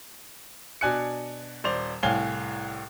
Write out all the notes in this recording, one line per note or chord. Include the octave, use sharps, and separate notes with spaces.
B2 D4 G#5 F#6 C#7
D#1 C5 D5 F7
C2 A2 C#5 F5 G#5 G7